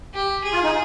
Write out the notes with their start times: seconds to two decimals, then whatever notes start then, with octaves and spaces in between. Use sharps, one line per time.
0.14 G4
0.44 G#4
0.53 F4
0.63 D#4